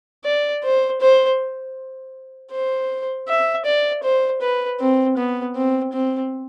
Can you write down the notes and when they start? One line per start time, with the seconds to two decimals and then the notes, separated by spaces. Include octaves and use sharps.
0.25 D5
0.64 C5
1.01 C5
2.52 C5
3.29 E5
3.65 D5
4.03 C5
4.41 B4
4.80 C4
5.17 B3
5.56 C4
5.93 C4